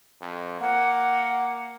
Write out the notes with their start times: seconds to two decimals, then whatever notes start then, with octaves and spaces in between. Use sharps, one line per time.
0.21 F2
0.61 A#3 F#5